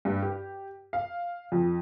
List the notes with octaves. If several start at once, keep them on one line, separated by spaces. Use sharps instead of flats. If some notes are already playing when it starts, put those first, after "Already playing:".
G2
G4
F5
F2